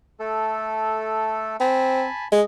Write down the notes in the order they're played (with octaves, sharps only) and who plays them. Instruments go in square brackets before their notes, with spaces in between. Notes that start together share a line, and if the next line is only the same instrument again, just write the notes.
[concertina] A3 A4
[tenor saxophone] C4 [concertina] G#5 A5 B5
[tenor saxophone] G#3 [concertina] D#5